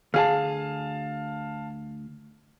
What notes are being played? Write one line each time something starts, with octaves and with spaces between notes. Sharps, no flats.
D2 G#4 F5 A5